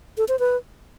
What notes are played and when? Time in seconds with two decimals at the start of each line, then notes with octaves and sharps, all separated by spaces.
0.18 A4
0.28 C5
0.39 B4